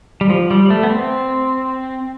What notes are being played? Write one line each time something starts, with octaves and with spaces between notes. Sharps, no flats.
G3
F3
G3
A3
B3
C4